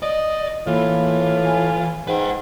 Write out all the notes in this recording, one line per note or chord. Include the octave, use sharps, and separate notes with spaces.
D5 D#5
A2 E3 A#3 F4
G#5
G#2 B4 F#5 G5